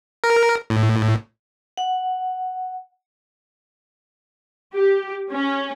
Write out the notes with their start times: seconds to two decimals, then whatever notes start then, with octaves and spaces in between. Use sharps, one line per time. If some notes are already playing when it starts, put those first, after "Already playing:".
0.24 A#4
0.70 A2
1.77 F#5
4.74 G4
5.31 C#4